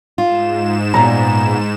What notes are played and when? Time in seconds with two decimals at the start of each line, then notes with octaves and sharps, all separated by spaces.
0.18 G#2 F4 E7
0.94 A#2 B3 A#5